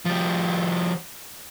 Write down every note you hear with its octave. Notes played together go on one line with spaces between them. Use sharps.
F3 G3